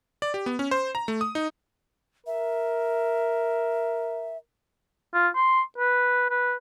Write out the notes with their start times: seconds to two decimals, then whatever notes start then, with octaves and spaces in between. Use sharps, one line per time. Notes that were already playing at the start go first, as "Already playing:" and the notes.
0.22 D5
0.34 G4
0.46 B3
0.59 C#4
0.71 C5
0.95 A#5
1.08 A3
1.21 D#6
1.35 D#4
2.27 A#4 E5
5.14 F4
5.36 C6
5.78 B4
6.30 B4